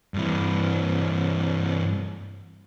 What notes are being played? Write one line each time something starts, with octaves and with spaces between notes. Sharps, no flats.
G2 E3